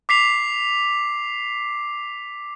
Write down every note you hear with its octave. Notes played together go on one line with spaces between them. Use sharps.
D6 B6 C7 F7